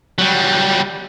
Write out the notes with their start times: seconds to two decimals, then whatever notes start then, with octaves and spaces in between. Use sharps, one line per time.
0.18 F#3 G3